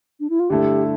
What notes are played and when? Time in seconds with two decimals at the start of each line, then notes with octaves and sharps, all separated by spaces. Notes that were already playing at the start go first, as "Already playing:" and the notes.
0.20 D4
0.29 E4
0.40 F4
0.50 G2 D3 A3 E4 G4 A4